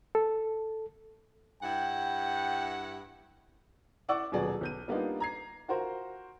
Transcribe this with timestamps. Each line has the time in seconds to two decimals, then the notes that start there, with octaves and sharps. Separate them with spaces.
0.15 A4
1.63 G2 E4 F#5 G5
4.09 E4 D5 F#5 C#6 D6 E6
4.32 D#1 B2 F#3 G#4 D5
4.61 B1 G6 D#7
4.88 G3 A#3 B3 D4 D#4 F4
5.20 A#5 G#6 C7
5.68 F4 F#4 A#4 C5